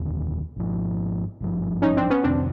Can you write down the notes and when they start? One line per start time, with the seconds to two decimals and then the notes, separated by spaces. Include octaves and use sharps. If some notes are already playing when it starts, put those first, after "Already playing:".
Already playing: F1 D#2 D3
0.56 G#1 G#2 F3
1.41 G#1 G2 D3 F3
1.82 C#4 D#4
1.97 C4 D4
2.10 B3 C#4
2.24 F2 C3 D#3 C4 D4